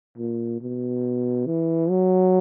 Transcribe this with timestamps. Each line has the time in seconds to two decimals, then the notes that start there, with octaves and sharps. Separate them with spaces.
0.17 A#2
0.61 B2
1.46 E3
1.90 F#3